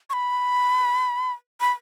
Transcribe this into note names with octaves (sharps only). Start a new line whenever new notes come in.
C#6
B5
B5